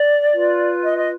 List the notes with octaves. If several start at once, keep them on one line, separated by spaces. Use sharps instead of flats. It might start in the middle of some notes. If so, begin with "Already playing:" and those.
Already playing: D5
F4 B4
D#5
D#5